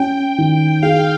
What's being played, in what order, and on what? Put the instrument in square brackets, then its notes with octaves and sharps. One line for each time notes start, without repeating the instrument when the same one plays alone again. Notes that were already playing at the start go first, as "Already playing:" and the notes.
Already playing: [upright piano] C#4 [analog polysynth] G5
[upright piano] D#3
[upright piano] G#4 [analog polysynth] F5
[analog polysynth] F5